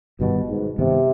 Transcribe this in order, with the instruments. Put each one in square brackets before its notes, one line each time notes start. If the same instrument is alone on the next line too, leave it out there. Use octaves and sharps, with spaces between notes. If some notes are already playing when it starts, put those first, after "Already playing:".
[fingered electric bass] G1 G2 D#3 G3 [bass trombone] B2
[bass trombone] G#2
[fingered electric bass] G2 D#3 B3 [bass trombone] C3